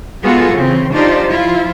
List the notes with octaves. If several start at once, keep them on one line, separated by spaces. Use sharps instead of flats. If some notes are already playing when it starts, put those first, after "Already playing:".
G#3 B3 F4 F#4 G#4 A4
C#3 E3 C4
D4 D#4 F4 G4 C5 D5
F3 E4 F4